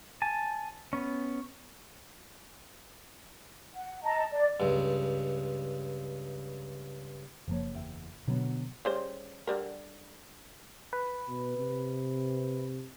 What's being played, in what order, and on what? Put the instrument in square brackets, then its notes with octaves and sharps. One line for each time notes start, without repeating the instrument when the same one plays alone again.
[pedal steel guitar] G#5 A5
B3 C#4
[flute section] F#5
D#5 A5 A#5
D5
[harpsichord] C#2 G2
[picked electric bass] F#1 A#3 [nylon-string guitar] F3 C#5
[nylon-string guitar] E2 E5 G5
[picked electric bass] B2 [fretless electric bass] D3 B3 [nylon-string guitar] F#3 F#4
[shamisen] C#3 G3 C5
D3 G3 A#4
[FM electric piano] B4
[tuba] B2
C3